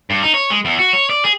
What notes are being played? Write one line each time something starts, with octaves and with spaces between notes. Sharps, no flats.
G2
D#4
C#5
G#3
E2
F#4
C#5
D5
G#4